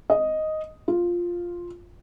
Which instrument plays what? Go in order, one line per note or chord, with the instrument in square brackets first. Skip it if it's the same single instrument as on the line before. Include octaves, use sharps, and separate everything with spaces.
[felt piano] D#5
F4